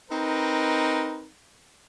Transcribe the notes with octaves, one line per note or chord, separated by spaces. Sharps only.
C4 D#4 A#4 B4